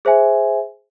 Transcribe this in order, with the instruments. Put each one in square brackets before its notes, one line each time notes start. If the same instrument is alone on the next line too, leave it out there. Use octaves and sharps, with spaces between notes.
[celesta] G#4 C5 E5 G#5